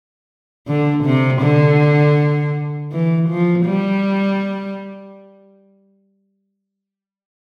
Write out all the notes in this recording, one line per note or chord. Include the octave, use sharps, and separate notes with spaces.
D3
C3
D3
E3
F3
G3